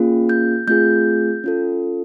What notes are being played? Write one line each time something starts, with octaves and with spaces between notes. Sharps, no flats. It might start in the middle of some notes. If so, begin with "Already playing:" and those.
Already playing: A#3 C#4 F4 G#4
G6
A3 C4 F4 G#4 G6
C#4 F4 A4